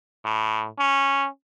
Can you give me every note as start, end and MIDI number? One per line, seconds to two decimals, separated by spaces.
0.25 0.68 45
0.78 1.27 61